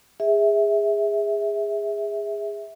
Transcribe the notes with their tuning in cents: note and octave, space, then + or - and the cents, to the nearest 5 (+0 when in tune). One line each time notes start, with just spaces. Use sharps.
G#4 -20 E5 -15